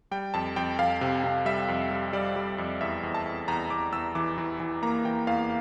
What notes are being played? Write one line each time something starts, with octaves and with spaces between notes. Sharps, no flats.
G3 G5
F2 A5
F2 G5
F2 F5
C3
C3
G3 E5
F2
G3
G3 D5
G3
F2
E2 E5
E2
A5
E2
E2 A#5
E2 D6
E2 E6
E3 D6
E3
E3
A#3 A#5
E3 G5
E2 F5